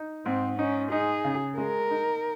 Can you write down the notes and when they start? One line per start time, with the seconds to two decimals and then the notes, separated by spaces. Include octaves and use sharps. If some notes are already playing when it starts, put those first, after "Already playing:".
Already playing: D#4
0.25 G#2 C4
0.58 C#4 D#4
0.92 D#4 G#4
1.24 C#3
1.58 G#3 A#4
1.91 D#4